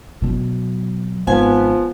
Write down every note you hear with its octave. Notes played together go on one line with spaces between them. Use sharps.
B2 F#3
G#1 F3 B3 G#5